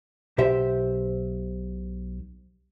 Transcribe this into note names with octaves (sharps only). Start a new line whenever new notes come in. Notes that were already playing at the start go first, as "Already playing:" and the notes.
B1 B2 G4 C5 E5